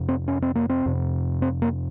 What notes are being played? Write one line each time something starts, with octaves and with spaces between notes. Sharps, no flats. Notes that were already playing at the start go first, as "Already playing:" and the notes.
Already playing: F2 C3
C4
C#4
C4
A#3
C4
F2 C3
C4
A#3